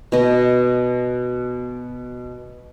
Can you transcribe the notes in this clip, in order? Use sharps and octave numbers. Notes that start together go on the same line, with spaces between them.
B2 D#5